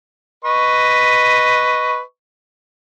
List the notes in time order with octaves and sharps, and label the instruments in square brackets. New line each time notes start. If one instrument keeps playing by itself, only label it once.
[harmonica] B4 D#5 C#6